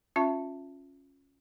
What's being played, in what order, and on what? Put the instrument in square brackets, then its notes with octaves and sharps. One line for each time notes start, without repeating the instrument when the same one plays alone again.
[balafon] C#4 F4 E5 A5